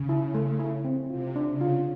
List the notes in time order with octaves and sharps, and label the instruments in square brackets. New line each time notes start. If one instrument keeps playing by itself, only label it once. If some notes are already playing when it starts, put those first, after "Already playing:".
Already playing: [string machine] C#3
[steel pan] E4
A3
E4
C4
[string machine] C3 [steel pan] F4
[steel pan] D4
[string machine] C#3
[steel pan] F4